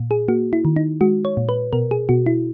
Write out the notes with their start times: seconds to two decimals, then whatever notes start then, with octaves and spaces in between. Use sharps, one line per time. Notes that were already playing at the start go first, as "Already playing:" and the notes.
Already playing: A#2
0.11 G#4
0.28 A#3 F#4
0.53 E4
0.65 D#3
0.76 D#4
1.01 G#3 F#4
1.25 C#5
1.37 A#2
1.49 B4
1.73 B2 A#4
1.91 G#4
2.09 B2 F#4
2.26 E4